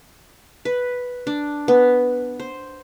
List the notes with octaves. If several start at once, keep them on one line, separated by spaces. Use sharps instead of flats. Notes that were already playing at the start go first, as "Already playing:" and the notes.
B4
D4
B3
C5